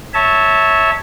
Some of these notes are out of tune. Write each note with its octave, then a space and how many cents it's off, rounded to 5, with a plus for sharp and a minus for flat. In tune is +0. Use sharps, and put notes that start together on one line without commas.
C#5 +0 E5 -15 A5 +0